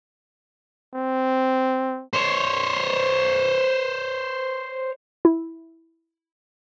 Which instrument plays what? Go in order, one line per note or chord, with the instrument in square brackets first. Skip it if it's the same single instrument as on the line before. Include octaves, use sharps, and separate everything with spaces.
[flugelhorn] C4
[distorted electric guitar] C5 C#5
[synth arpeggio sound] E4